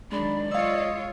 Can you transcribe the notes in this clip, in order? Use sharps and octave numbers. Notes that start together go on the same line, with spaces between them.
D#3 F#3 G#3 D4 D5 B5
F4 C#5 D#5 F5 E6